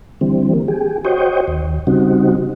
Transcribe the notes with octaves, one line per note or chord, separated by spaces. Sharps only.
D3 E3 G3 C4
A#3
G4 G#4
F#4 C5 C#5 D#5 G5
D#2
C#3 G3 C4 D#4 F#4